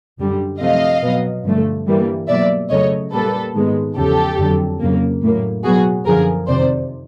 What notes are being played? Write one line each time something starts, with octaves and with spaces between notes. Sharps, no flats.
F#2 D3 G3
C3 F3 A3 D#5 F5
B2 F#3 B3
G2 D3 F3 A3
G2 E3 G3 A#3
B2 F#3 A#3 D5 E5
F2 C#3 F#3 A3 C#5 D#5
A#2 G3 A#3 A4 B4
G#2 D#3 G#3 B3
E2 C#3 F3 G4 A4
F2 D3 F#3
F2 C#3 F#3 A#3
A2 F#3 A#3
B2 F#3 B3 F#4 G#4
F#2 D3 F3 G#4 A#4
F2 C3 D#3 C5 D5